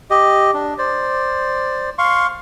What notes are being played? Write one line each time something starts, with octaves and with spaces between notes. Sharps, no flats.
G4 D#5
D4
C5 D5
F5 C6 C#6